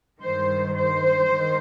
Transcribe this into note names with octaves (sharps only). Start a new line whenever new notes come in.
G2 D#3 C5
C5
D#3